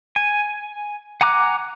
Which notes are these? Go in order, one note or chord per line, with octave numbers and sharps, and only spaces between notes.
G#5
F#5 G#5 A#5 D6 F#6